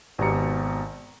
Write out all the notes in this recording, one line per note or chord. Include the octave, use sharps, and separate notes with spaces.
G#1 B2 B3 G4 A#5 C#7